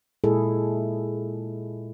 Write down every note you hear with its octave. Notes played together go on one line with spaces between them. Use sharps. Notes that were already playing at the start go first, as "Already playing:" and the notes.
A#2 G#3 E4 G#4 A4